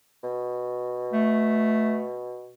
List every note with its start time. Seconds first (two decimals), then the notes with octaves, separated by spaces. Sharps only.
0.23 B2
1.13 A3